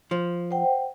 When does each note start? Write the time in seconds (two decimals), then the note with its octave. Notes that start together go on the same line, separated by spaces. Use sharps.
0.11 F3
0.51 C5 F#5 G5